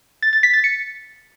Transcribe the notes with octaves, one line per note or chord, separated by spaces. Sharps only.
A6
A6
B6
A6
C#7